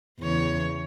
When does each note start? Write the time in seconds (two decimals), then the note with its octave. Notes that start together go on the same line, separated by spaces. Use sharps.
0.20 E2 C#3 C#5